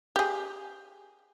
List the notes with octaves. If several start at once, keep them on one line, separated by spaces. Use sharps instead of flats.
G4 G#4